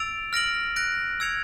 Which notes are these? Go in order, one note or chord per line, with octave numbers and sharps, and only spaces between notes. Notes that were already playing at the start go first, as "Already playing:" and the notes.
Already playing: E6 A6 D7 F7
F6 A#6 D7 F#7
F#6 A#6 D7
E6 G#6 C#7 F7